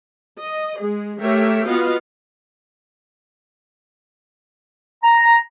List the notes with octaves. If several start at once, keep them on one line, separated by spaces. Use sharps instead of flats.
D#5
G#3 G#4
A3 G4 A#4 C#5 E5 G5
B3 F4 F#4 D#5 F5
A#5